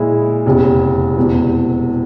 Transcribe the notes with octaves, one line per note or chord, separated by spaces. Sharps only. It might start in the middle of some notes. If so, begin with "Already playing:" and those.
Already playing: A#2 G#3 E4
F1 E2 C#3
E1 E2 C3